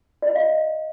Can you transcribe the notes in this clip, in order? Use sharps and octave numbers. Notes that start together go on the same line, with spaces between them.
D5
D#5
F5